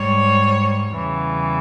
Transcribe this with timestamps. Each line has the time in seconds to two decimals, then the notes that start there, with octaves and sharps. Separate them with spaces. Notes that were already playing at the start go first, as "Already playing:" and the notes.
Already playing: G#2 G3 C#5
0.90 E2 C#3 E3 G3